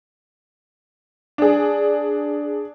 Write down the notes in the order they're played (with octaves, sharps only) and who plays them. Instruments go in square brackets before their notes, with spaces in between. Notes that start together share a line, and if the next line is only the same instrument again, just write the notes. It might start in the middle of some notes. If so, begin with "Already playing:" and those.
[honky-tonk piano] D4 G#4